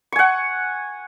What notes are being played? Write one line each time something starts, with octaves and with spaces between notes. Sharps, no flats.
F#5 G#5 C#6